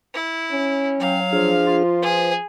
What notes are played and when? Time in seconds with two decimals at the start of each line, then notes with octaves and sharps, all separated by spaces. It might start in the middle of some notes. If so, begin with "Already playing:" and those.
0.15 E4
0.52 C#4
1.00 F#3 C#5 F5 G5
1.33 F3 D4 G#4 F6
1.66 F4
2.02 G#4 B4 C5